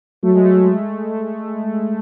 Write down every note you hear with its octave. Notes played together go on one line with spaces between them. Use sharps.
F#3 A3
G#3
A3
G#3